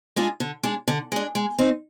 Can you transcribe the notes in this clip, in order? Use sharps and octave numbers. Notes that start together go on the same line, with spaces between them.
G#3 D4 F4 G#4
D3
G#3 D4
D3
G#3 D4
G#3
C4 D#4